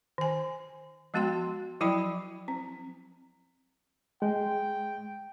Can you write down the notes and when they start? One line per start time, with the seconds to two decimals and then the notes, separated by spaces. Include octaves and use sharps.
0.18 D#3 G#5
1.14 F3 G#3 B3 F#4 G5 C6
1.81 F3 F#3 E4 D5 G5 B5
2.48 C4
4.22 G#3 G5